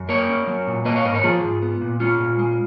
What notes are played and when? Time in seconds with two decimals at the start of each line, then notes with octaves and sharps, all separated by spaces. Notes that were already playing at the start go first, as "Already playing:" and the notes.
Already playing: F#2
0.09 A#3 A#4 C#5
0.29 C#4
0.47 F#3
0.67 A#2
0.85 A#3 B4 D#5
0.96 C#5 F5
1.05 G#2 B4 D#5
1.14 A#4 C#5
1.24 F3 F4 G#4
1.43 G#2
1.62 B3
1.81 A#2
2.00 G#3 C#4 F4
2.19 A#2
2.39 G#3